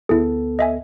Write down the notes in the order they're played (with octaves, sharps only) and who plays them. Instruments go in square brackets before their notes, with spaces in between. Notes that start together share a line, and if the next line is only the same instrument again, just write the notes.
[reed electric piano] D2 B3 A4 [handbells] E4 G#4
[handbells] D#5 E5 G#5